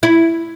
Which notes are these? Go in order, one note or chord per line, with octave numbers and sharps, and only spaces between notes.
E4